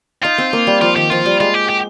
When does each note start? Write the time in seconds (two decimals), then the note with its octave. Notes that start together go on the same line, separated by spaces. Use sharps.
0.24 D#4 F4
0.38 C4
0.53 A#3
0.67 G3
0.81 F3 F4
0.96 D#3 G4
1.10 F3 F4
1.26 G3
1.40 G#3 F4
1.54 G4
1.69 G4